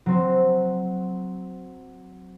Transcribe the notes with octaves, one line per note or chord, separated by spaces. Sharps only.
F#3 C4